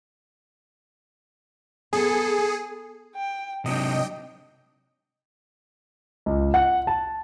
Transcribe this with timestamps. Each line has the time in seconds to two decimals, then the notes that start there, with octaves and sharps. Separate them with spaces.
1.93 B3 G#4 A4
3.15 G5
3.66 C3 F#3 D4 D#5 G5
6.26 C#2
6.54 F#5
6.87 A5